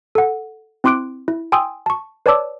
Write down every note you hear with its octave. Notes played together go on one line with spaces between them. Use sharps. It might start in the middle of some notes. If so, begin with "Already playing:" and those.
A4 F#5
C4 E4 C6 D6 F#6 D7
E4
G5 G#5 C6 D#6 E6
A5 C#6
B4 C#5 D5 A5 D6 E6